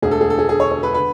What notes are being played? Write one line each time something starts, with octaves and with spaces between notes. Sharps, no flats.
E1 D2 D3 G#4
A4
G#4
A4
G#4
G#4
C#5
C#5
B4
D3 B4